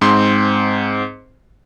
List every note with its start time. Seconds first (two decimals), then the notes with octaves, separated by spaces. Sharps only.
0.01 G#2 C4 C6